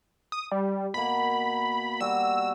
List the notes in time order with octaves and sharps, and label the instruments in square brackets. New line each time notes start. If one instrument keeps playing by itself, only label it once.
[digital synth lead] D#6
G3
[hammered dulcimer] B2 A#3 [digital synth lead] B5
[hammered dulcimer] G3 F#4 [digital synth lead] E6